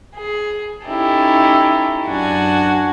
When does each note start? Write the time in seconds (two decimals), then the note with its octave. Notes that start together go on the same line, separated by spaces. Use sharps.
0.15 G#4
0.86 C#4 D#4 E4 G4 A4
2.07 F#2 D4 F#4 G#5